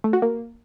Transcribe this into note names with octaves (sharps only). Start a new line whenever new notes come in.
A3
F#4
A#3